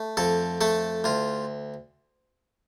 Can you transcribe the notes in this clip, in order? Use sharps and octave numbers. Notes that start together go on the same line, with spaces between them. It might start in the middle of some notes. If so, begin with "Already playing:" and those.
Already playing: A3
F2 A4
A3 A4
D2 F4